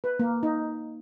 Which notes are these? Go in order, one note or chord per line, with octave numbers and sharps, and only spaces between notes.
B4
A#3
D#4